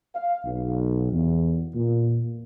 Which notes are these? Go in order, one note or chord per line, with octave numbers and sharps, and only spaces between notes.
F5
B1
E2
A#2